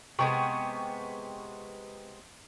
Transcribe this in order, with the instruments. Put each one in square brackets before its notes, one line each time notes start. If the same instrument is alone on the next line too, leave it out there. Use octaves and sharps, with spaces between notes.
[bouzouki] C3 G#3 B3 [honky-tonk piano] G5 C#6